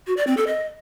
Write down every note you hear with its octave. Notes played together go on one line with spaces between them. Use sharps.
F#4
D5
C4
A4
D#5